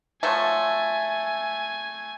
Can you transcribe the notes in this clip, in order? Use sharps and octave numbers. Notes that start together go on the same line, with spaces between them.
F3 F#3 A3 G#5